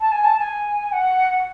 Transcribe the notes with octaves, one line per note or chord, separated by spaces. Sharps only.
A5
G#5
A5
G#5
F#5